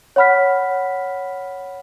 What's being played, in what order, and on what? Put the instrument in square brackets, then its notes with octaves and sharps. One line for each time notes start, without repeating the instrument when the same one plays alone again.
[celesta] C#5 F#5 B5 F6 B6